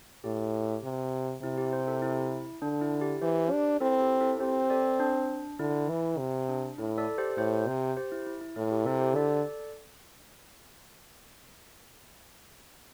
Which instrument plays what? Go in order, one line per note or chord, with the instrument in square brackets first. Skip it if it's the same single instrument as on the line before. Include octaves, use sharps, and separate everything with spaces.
[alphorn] A2 [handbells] G4
[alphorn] C3
[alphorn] C3 [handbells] E4
[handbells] G4
G4 C5
E4 A4
E4
[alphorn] D3 [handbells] D4
[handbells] E4
G4
[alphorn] E3 [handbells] G4 C5
[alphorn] D4
[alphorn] C4 [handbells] E4 A4
[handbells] G4
E4 A4
[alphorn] C4 [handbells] G4 C5
[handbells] A4 D5
D4
[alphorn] D3 [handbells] E4
[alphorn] E3
C3
[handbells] D4
[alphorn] A2 [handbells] E4
[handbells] A4 D5
G4 C5
[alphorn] A2 [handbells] G4 C5
[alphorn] C3
[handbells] G4 C5
E4
E4
E4
[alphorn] A2 [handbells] E4
[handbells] G4
[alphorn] C3 [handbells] E4 A4
[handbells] G4 C5
[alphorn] D3 [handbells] A4 D5